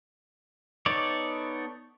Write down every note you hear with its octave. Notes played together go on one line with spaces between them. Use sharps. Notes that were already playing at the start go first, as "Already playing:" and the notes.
B3 D#4 A4 C#5 D5